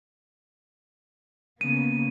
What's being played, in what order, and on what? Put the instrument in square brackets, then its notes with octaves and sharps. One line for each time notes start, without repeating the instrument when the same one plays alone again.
[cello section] C#3 A#3 B3 [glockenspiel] D#7